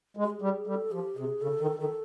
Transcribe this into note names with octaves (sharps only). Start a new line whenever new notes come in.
G#3
G4
G#4
G3
G3 A4
F3 G4
C3 G#4
C#3 A4
D#3
D#3 A4